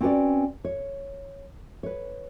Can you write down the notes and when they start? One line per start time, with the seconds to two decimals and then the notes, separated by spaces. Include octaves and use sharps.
0.01 C4 C#4 F#4 A#4 B4 D5
0.65 C#5
1.83 B4 C#5